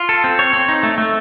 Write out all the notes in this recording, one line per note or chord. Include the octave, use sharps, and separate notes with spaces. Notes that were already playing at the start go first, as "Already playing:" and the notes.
Already playing: F4
A4
C4
C#5
C4
D#4
A3
A3